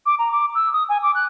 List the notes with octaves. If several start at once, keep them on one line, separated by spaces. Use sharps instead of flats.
D6
A#5
D6
E6
D#6
G#5
D6
F#6